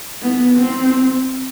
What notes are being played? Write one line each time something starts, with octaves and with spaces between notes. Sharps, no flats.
B3
C4